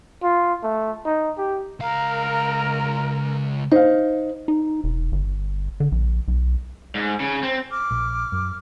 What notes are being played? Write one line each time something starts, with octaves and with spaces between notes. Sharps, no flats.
F4
A3
D#4
G4
C#2 A#4 F5
D#4 C5 F5
D#4
E1
G1
D3
A#1
B1
G#2
C#3
C4
D6 F6
A#1
F#2